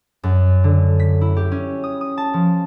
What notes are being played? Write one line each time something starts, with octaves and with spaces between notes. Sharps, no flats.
F#2
D3
B6
E4
G4
C#4
D#6
D#6
A5
F3